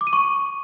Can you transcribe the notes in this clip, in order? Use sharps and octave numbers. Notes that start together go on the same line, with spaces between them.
D6
D#7
C#6